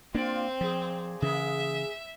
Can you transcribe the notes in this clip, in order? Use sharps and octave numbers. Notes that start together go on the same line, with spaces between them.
A#3 C4 D4 F4 D5
A#2 F3 G#4
C#3 E3 A#3 G#4 E5